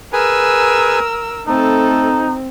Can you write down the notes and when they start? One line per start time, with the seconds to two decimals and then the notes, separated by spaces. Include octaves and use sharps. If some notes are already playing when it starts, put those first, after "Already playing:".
0.13 G#4 A#4 B4 G#5 E6
1.47 A3 C4 D#4 A4